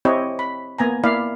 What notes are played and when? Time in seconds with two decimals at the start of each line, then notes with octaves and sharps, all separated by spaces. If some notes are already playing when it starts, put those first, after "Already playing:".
0.05 C4 E4 G4 C#5 D#5
0.39 B5
0.79 A#3 B3 G#5 A#5
1.04 A#3 E4 D5 F5 B5